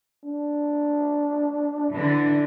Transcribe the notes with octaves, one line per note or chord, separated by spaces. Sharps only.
D4
D3 E3